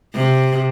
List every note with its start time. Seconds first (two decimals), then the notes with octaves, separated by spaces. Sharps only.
0.15 C3